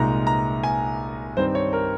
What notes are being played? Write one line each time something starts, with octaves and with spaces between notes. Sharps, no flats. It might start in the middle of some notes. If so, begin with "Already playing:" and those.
Already playing: C2 A#2 G#3 D#4 A#5
A#5
G#5
G2 D#3 G3 C4 D#4 C5
C#5
A#4